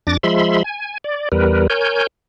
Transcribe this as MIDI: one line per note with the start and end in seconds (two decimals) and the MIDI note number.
0.07 0.17 41
0.07 0.17 62
0.07 0.17 86
0.07 0.17 93
0.07 0.17 94
0.23 0.63 53
0.23 0.63 56
0.23 0.63 76
0.23 0.63 83
0.23 0.63 84
0.64 0.98 80
1.04 1.29 74
1.32 1.67 40
1.32 1.67 55
1.32 1.67 70
1.32 1.67 71
1.70 2.07 70
1.70 2.07 73
1.70 2.07 80
1.70 2.07 91